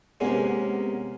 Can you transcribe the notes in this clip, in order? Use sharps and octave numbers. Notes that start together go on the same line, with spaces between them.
C3 G#3 A#3 B3 C#4